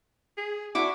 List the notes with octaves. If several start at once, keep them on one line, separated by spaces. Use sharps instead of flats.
G#4
D4 E4 F#4 D6